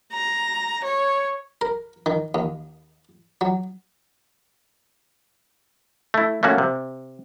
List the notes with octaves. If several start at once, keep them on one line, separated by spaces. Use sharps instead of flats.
A#5
C#5
A#4
D#3
D#2
F#3
A3 E4
A3 A#3 C#4 F#4
C3